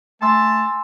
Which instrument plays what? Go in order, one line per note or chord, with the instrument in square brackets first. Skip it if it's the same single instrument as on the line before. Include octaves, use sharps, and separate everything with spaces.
[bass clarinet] A3 [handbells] G#5 C6 E6 [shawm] A5